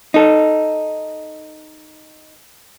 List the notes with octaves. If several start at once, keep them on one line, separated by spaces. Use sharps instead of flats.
D#4 A4